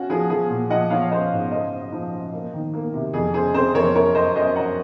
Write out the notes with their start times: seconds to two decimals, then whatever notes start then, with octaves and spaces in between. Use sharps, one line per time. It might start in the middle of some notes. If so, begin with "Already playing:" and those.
Already playing: C#4 F#4
0.10 F3 G#4
0.30 F3 G#4
0.50 A#2
0.70 F3 D#5 F#5
0.90 F3 C#5 F5
1.11 C#4 C5 D#5
1.32 G#2
1.51 C#3 C5 D#5
1.72 F#2
1.92 F3
2.13 C#3
2.33 A#3
2.53 D#3
2.74 A#3
2.94 C3
3.14 F2 G#4
3.34 C#3 G#4 C5
3.54 C4 G#4 C5
3.74 F2 A#4 C#5
3.95 F#2 A#4 C#5
4.15 F#2 C5 D#5
4.35 F#2 C5 D#5
4.56 F#2 F#5 A#5